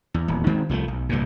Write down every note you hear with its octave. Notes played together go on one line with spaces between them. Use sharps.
E2
D#1 E2
D#3 G#3 C4
C2 F3 F#3 A3
B1
C2 G2 A#2